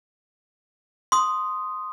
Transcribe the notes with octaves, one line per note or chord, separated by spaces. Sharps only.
C6 D#6